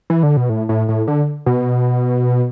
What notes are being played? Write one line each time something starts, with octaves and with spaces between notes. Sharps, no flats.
E3
D3
B2
A2
A2
A2
D3
B2